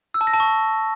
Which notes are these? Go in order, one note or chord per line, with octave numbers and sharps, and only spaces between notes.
E6
A5
A#6
A5
C#6